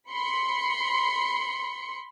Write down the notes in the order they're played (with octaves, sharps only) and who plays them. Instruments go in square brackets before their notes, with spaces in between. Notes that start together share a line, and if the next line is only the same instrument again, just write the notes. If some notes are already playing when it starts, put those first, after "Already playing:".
[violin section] B5 C6 C#7